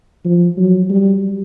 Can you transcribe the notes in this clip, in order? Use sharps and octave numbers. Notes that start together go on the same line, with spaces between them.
F3
F#3
G3